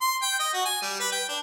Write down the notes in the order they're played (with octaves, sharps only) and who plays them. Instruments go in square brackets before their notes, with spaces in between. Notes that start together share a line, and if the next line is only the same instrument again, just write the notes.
[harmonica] C6
G5
D#5
F#4
G#5
G3
B4
G5
D4